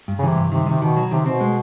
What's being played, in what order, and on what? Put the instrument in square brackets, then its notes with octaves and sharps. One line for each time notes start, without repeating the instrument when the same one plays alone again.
[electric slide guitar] G2
[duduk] C#3
[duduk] C3 [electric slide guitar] E3
[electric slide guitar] G2
[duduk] C3 [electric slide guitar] D#3
[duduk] C3 [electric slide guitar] D#3
[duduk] B2 [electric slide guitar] D#3
[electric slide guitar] F#3
[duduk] C3 [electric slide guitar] D#3
[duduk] B2 [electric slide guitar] C4
[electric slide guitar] G#3